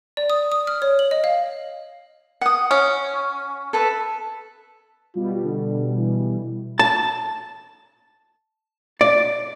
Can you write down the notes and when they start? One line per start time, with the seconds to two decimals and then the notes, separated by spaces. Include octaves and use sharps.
0.17 D5
0.30 D#6
0.52 D#6
0.67 F6
0.82 C#5
0.99 F#7
1.11 D#5
1.24 F5
2.41 F#5 D#6
2.71 C#4
3.73 A4 B4 E5
5.15 B2 G3 F4
5.44 D3
5.97 E3
6.79 A5
9.01 D5